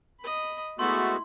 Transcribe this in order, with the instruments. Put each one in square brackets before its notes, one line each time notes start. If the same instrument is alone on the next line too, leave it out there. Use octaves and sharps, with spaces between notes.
[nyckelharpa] D#5 B5
[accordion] G#3 B3 F#4 [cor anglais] A3 [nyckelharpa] E4 [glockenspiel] C6